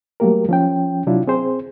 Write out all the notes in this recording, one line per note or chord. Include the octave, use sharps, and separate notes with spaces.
F#3 G3 A3 A#3 G4 A#4
F3 C#4 G5
C3 F#3 D4 E4 F4
C4 G#4 C5